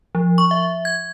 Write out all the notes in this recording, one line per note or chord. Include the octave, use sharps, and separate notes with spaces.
F3
C#6
E5
G#6